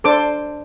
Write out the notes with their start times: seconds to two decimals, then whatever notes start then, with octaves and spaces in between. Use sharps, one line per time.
0.04 D4 A4 C5 D6